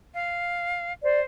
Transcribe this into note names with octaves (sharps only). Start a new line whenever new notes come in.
F5
C5 D5